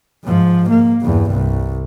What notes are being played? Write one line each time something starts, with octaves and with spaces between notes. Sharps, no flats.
G#2 F3
A#3
E2 G2
C2